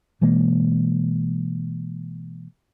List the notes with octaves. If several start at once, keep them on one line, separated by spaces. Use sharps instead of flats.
B2 E3 G#3 A#3